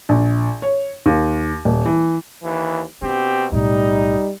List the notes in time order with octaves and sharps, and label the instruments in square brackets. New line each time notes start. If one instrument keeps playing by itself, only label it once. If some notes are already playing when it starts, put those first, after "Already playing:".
[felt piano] A#1
C#5
D#2
D#1
E3
[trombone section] D#2 E3
[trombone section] B2 C4 G4 [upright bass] D4
[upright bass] B1 A2 [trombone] G3 [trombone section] D#4